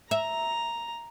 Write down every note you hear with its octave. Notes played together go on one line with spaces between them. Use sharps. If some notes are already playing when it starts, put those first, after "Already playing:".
E5 A#5